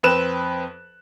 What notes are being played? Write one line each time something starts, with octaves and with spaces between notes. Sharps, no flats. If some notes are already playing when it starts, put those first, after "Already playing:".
F2 C4 B4 F#6 E7